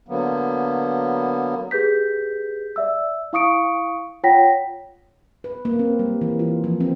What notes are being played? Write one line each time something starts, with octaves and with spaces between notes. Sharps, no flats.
D3 F#3 A#3 B3
G4 G#4 B4 G6 B6
D5 E5 E6
E4 F5 C#6 D#6 C#7 D7
F4 C#5 F#5 G5 A#6 B6
B4
A#3
C4
G3
E3
F4
F3
C4